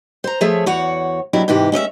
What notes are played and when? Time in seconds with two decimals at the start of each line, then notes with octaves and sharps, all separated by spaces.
0.24 C5 A#5
0.41 F3 A3 G#4 C#5 E5
0.66 E2 F#4 C#5 F#5
1.33 B2 F#3 D4 E4 G4
1.48 G#2 C3 E3 G4
1.72 G#3 C#4 D#5 E5